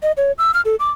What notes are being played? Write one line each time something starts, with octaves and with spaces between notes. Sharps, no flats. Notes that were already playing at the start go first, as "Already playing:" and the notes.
D#5
C#5
E6
F6
A4
D6